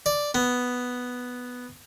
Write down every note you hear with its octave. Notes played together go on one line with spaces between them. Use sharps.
D5
B3